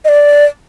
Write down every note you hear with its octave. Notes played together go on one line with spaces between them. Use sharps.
D#5
D5